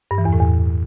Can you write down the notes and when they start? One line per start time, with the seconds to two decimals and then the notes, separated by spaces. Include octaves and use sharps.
0.11 G2
0.18 E3
0.25 E2
0.33 A2
0.40 E2